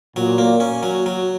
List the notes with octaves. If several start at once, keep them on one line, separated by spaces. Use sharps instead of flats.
A#2 F#3
A#3
C#4
F#3
F#3